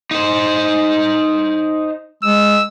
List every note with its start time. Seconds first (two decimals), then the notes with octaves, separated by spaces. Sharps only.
0.11 D#4 C5
2.23 G#3 E6